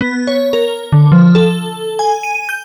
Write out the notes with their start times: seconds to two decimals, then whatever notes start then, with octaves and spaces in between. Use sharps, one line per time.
0.01 B3
0.27 C#5
0.53 A#4
0.92 D3
1.12 F3
1.35 A4
1.99 G#5
2.23 D#7
2.49 G6